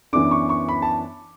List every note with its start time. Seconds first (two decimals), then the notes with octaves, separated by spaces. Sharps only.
0.13 F#2 E3 B3 D4 D6
0.31 C#6
0.49 C#6
0.69 B5
0.82 A5